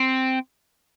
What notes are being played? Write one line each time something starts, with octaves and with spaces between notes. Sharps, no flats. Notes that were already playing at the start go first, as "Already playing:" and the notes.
Already playing: C4